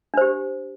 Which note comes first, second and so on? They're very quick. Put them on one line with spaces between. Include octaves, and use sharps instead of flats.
D4 C5 G4